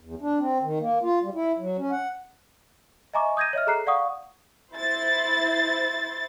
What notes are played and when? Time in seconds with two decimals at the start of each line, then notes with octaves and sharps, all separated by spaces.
0.01 E2
0.22 D4
0.39 C4
0.63 D#3
0.80 A#3
1.03 F4
1.23 G3
1.35 E4
1.59 F#3
1.78 C#4
1.91 F#5
3.14 D#5 E5 G#5 A#5 C#6 D6
3.37 D#6 G6 G#6 A#6 D#7
3.53 C#5 D#5 E5 F6
3.67 G#4 A4 A#5 F#6 C7
3.87 D5 F5 F#5 C#6 D#6
4.73 E4 C5 A6